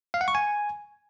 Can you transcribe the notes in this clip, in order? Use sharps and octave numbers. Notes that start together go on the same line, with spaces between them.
F5
F#5
C#6
G#5